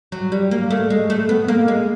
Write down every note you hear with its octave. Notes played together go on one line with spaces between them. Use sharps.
F#3
G3
A#3
A3
G#3
A3
B3
A#3
G#3